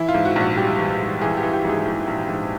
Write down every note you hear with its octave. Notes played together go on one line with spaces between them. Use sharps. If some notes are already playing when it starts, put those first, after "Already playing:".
Already playing: E3 E4
F4
G#2
F#4
A#1 F#4
G3 G4
E3
G#2
E3 G#4
G4
E3
G4
G#2 G#4
E3
A#1
G#2